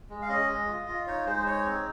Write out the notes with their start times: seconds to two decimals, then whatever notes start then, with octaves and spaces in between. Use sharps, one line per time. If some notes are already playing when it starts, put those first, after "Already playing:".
0.09 G#3
0.22 F5
0.29 C#4 D#5
0.48 G#3
0.67 F4
0.87 F4
1.07 D#4 C#5
1.26 G#3 C5
1.46 D#4 C#5
1.66 C4